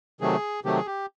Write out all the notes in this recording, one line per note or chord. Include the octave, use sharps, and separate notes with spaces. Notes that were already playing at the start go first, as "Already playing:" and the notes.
C3 D#3 F#3 A3 G#4
C3 D#3 F#3 A3 G4
G#4
G4